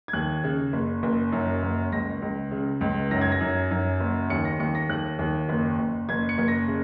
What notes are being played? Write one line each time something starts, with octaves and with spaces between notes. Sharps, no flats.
G#6
D#2 F#6
C#3
F#1
F#1
F#2
F#1
C#2 A#6
C#2
C#3
C#2
F#2 A#6
G#6
A#6
F#2
F#2
F#1
D#2 C#7
A#6
D#2 C#7
A#6
D#2 F#6
D#2
F#1
F#1
F#1 G#6
C#7
F#1
A#6
C#3